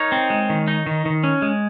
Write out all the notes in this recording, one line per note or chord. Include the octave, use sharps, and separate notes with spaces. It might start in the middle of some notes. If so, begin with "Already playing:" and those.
Already playing: D#4 A#4 C#5
C4
G#3
D#3
D#4
D#3
D#3
C#4
G#3